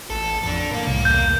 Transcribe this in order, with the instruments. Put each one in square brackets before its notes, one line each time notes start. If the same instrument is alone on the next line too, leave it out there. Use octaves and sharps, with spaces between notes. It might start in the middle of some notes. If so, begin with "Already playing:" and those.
[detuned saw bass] A1 [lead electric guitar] A4
[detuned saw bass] F2 [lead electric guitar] D4 A4
[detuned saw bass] A2 [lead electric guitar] A#3 A#4
[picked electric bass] C2
[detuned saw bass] E2 [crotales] G6